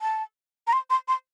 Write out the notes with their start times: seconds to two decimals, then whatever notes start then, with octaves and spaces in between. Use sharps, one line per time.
0.01 A5
0.67 A#5
0.73 C6
0.90 C6
1.08 C6